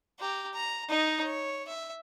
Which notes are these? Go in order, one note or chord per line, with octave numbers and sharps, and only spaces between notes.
G4 A#5
A#5
D#4 D#5
C#5
E5